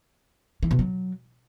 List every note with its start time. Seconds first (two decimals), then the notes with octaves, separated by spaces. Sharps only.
0.63 E3
0.71 B2
0.79 F#3